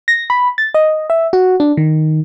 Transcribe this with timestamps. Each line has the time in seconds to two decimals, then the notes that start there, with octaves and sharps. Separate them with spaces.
0.08 A#6
0.30 B5
0.58 A6
0.74 D#5
1.10 E5
1.33 F#4
1.60 D4
1.77 D#3